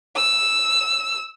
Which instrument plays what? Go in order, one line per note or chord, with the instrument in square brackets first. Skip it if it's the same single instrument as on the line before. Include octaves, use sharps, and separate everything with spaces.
[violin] E6